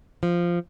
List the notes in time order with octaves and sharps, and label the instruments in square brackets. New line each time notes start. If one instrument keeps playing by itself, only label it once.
[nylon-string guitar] F3